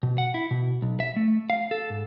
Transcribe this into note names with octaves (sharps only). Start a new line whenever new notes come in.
B2
F#5
E4
B2
B1
E5
A3
F5
A4
G#2